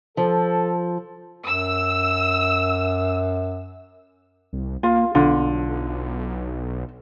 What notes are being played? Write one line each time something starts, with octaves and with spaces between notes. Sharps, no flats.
F3 A4
F#2 E6
C2
A#3 F4 F5
B1 D3 F4